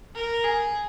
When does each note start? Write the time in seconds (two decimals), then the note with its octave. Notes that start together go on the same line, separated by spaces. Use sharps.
0.15 A#4
0.44 G#4